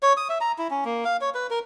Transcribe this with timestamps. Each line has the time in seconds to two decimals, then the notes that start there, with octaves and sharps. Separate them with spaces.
0.03 C#5
0.17 D#6
0.29 E5
0.41 A#5
0.59 E4
0.71 C#4
0.85 A#3
1.05 F5
1.21 C#5
1.34 B4
1.50 A#4